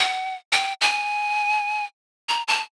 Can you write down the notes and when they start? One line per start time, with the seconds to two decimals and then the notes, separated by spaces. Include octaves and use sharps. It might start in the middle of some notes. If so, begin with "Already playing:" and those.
Already playing: F#5
0.52 G5
0.81 G#5
2.29 A#5
2.48 A5